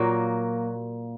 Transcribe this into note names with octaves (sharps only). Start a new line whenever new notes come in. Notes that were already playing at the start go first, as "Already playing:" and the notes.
Already playing: A#2 F#3 A#3